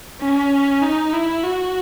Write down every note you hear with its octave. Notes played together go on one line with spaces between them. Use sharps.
C#4
D#4
E4
F#4